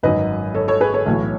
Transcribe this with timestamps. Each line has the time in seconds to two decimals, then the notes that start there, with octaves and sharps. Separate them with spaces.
0.03 G#1 F#2 D#3 F#3 B4 D#5
0.55 A4 C#5
0.68 A4 C#5
0.81 G#4 B4
0.93 A4 C#5
1.06 B1 A2 E3